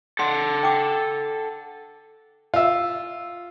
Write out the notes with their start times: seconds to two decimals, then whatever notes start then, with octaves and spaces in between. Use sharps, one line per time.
0.19 A4 F#5 C6
0.63 G5 D6
2.54 F4 E5